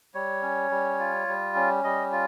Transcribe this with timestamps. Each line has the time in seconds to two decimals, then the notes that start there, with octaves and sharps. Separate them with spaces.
0.14 G3 C#5
0.42 C#4
0.71 G3
0.99 F4
1.28 G3
1.55 C#4
1.84 G3 D#5
2.12 F4